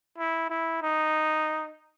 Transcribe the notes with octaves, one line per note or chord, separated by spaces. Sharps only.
E4
E4
D#4